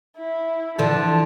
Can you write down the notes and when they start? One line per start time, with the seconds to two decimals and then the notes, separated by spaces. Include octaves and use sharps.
0.17 E4
0.79 D3 E3 F3 A5